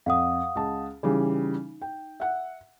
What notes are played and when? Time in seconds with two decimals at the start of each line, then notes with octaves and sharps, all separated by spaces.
0.06 F2 F5 F#5 D#6
0.55 C#2 A5
1.03 C#3 E3 G3 D#4
1.82 G5
2.20 E5 F#5